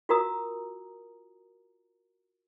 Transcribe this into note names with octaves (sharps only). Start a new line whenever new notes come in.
F4 F#4 A#4 A#5 D#6